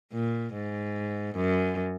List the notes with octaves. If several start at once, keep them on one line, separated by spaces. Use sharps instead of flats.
A#2
G#2
F#2